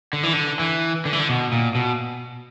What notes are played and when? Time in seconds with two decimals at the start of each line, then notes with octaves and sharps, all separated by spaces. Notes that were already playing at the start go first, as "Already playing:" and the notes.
0.13 D3
0.23 E3
0.33 D3
0.59 E3
1.05 D3
1.13 E3
1.20 D3
1.29 B2
1.52 A#2
1.75 B2